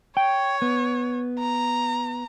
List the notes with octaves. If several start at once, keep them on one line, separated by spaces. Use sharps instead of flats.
C#5 G5
B3
A#5